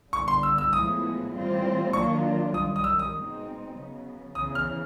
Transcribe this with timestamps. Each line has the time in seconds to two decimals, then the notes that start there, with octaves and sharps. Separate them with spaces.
0.12 D3 G3 B3 C#6
0.28 C6
0.43 E6
0.58 E6
0.73 A2 F3 G#3 B3 E4 D#6
1.34 A2 E3 G3 C4 F4
1.93 D#3 F#3 A#3 D4 F4 C#6
2.54 F#2 D#3 G3 D#6
2.76 D#6
2.84 E6
2.99 D#6
3.15 B2 G#3 C4 D#4
3.75 C#3 F#3 B3
4.35 E2 C#3 E3 D#6
4.55 F6